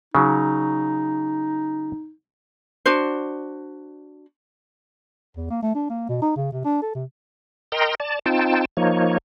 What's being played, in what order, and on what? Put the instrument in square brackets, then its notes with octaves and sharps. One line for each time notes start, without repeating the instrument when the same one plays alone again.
[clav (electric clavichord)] C#3 F#3 [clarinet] D#4
[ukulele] D4 F#4 C5
[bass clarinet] E2
A#3
A3
D4
A#3
B2
D#4
C#3
C3
D4
A4
C3
[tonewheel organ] A#4 D#5 G5 A#5 C6
D5 A5
C4 D#4 F4 G5 A5
F3 A#3 D#4 C#5